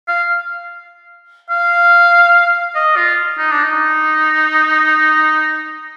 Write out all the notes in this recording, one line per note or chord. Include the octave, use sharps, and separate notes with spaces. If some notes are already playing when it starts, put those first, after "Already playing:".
F5
F5
D#5
F4
D#4
D4
D#4